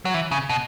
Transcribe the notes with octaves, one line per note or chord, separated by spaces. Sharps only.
F#3
E3
C#3
B2